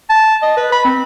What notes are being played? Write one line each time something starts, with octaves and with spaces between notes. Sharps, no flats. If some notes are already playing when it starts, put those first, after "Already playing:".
A5
D#5
B4
B5
C4